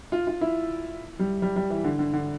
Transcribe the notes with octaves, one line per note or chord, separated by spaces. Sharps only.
F4
F4
E4
G3
G3
G3
E3
D3
D3
D3